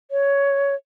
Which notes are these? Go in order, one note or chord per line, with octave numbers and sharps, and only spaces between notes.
C#5